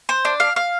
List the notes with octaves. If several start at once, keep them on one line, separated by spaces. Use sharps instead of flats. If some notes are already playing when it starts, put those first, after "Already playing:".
C5
D4
F5
F5